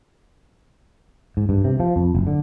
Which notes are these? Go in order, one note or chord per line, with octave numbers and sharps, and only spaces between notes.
G#2
G2
C3
F3
F2
F#1
D3